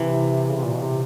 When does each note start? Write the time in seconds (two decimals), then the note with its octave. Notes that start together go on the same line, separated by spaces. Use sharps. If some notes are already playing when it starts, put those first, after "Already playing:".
Already playing: C3 E3
0.48 C#3
0.57 C3
0.64 A#2
0.73 B2
0.82 C3